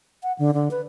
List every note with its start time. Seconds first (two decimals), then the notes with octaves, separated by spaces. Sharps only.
0.23 F#5
0.39 D3
0.54 D3
0.71 B4